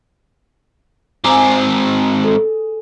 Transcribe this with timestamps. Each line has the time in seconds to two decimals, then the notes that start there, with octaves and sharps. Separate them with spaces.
1.24 G#2 C4 G#4 A#5 D6
2.24 A4